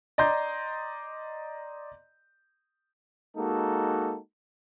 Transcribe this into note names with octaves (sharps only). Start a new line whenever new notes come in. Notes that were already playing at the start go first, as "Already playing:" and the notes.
D5 D#5 A#5 C6 G6
G#3 A#3 D#4 F#4 A4